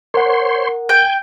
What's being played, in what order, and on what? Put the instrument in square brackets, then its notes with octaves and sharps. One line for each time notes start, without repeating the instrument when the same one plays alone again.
[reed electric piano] A#4 F#5 [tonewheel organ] C5 C#5 C6
[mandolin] G5 [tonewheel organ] G#5 G6